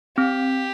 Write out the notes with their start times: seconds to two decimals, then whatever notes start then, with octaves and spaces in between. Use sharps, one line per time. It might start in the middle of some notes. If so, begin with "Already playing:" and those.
0.17 C4 G4